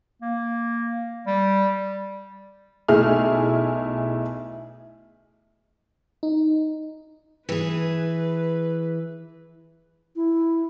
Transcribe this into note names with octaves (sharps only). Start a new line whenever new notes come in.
A#3
G3
B1 A3 E4 G#4 F6
D#4
E3 G#4 B4
E4